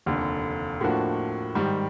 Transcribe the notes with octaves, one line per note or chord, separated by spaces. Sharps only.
F1 D#2 D3
A2 F3 A#3 D4 F#4
G#2 D#3 G3